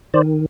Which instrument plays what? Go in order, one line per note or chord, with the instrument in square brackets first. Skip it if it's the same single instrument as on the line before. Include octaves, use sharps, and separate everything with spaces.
[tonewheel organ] D#3 C5 D5